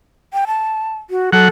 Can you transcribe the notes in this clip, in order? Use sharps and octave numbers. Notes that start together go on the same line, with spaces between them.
G5
A5
F#4
F#3 A4 F#5